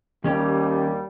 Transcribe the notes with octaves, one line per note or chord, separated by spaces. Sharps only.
D#2 D#3 G3 C#4 G4